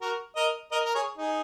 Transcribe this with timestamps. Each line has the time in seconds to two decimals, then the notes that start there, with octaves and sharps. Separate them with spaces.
0.01 F#4 A#4
0.36 A#4 D#5
0.72 A#4 D#5
0.85 A#4
0.95 G#4 C#5
1.18 D#4 G#4